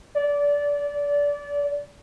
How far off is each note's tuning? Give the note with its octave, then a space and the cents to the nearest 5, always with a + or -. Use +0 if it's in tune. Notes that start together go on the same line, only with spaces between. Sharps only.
D5 -25